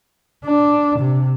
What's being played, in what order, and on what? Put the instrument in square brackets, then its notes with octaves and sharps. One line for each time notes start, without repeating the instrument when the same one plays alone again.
[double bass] D4
C3